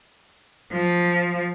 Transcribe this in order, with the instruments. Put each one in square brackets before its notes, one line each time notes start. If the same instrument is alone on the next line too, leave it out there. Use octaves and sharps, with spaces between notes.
[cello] F3